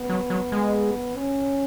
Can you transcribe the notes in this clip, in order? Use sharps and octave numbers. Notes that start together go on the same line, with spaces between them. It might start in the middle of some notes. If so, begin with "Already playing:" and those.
Already playing: B3
F#3
F#3
G#3
C#4